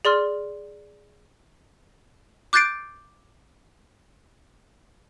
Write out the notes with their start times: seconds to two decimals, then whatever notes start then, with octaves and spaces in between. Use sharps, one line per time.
0.05 G#4 D5 C6 F6
2.53 D6 F#6 G6 A6 C7 D7